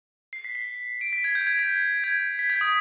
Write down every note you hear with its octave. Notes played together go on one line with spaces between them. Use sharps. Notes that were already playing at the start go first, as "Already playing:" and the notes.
C7
B6
C7
D7
B6
G#6
G6
G#6
B6
G#6
B6
G#6
D#6